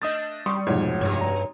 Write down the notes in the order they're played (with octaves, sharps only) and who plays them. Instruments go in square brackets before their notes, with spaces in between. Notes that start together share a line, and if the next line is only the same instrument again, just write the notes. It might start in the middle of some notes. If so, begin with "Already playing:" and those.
[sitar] A3 D4 [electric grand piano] D#5 D#6 A6
[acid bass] G3 [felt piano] C6 C#6 D#6
[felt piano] F1 B1 F3 [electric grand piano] G#2 [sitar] C#5
[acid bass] G2 [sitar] G3 C#5
[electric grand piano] A#5